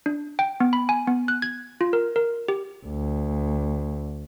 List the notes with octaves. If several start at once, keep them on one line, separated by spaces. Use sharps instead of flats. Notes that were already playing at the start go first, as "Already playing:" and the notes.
D4
G5
B3
B5
G#5
B3
F#6
G#6
F4
A#4
A#4
G4
D2